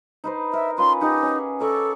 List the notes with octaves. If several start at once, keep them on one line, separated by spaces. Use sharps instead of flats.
D#4 B4 C5
A#4 E5
C#4 F4 B4 C6
D#4 G4 F#5
C#4 G#4
A4 A#4 D5 C#6